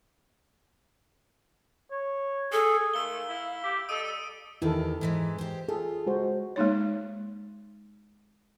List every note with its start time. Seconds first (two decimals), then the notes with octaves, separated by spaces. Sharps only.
1.91 C#5
2.53 G#4 A4
2.94 D#3 G#3 A3 F5 E6 G7
3.28 E4
3.63 E4 G4
3.89 G3 A4 D#5 D#6 D7 D#7
4.62 E2 D#3 E4 G4 A4
5.01 G#2 E3 G#3
5.38 G4 C5
5.69 F4 G#4 A4
6.07 G#3 F#4 C5
6.56 G#3 A#3 D#4 C#5